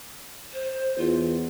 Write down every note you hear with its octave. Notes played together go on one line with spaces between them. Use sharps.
C5
E2 F4